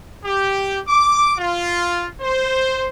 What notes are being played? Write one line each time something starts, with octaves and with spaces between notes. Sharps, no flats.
G4
D6
F4
C5